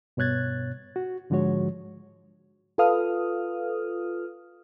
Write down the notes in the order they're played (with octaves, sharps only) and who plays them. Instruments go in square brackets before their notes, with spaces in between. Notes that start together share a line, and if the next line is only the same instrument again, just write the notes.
[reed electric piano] G2 B2 C#5 F#6 G#6 A6
F#4
G#2 D3 F3 G#3 F#4 C#5
[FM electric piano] F4 A4 B4 F5 D#6 F6